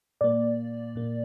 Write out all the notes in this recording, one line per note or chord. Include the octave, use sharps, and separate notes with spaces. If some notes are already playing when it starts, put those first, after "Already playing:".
A#2 A#3 D5
A#2 A#3